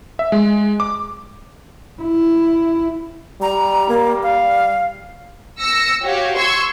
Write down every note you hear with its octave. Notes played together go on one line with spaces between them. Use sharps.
E5
G#3
D6
E4
G3 A#5
A#3
F5
E6 A#6 C#7
F#4 G4 C#5 F5
C6 C#6 E6 G#6